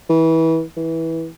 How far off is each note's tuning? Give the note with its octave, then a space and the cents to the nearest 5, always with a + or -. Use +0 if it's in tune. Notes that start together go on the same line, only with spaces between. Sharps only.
E3 -25
E3 -15